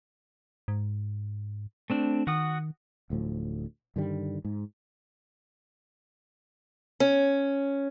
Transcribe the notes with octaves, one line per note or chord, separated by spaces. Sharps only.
G#2
A3 C4 D4
D#3 F#4 F#5 D#6
D1 D2 A2 F3
G2 D3 D#3 G3
G#2
C#4